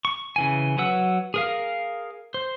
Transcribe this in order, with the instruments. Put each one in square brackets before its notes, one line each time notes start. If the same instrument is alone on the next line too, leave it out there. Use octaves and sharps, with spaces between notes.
[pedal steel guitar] C#6
C#3 E3 G#5
F#3 B4 F#5 E6
G#4 A#4 F5
C5